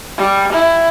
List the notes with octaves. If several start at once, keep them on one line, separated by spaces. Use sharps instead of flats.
G3
E4